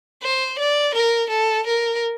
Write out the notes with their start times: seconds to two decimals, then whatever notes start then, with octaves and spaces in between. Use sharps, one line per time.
0.23 C5
0.59 D5
0.95 A#4
1.30 A4
1.67 A#4